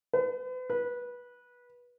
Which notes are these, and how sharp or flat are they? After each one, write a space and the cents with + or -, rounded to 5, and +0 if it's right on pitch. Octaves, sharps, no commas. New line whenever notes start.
B4 +40
B4 -20